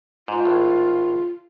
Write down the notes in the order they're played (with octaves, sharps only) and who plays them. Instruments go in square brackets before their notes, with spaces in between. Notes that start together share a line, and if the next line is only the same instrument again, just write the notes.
[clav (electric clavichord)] G#2 [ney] F4
[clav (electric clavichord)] G#1 A2